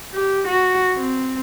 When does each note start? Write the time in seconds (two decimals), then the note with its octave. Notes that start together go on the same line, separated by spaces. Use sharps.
0.14 G4
0.48 F#4
0.97 C4